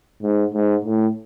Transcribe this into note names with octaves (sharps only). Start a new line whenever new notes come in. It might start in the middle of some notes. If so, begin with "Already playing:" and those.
G#2
G#2
A2